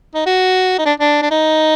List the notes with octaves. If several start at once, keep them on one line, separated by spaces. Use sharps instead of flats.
D#4
F#4
D#4
D4
D4
D4
D#4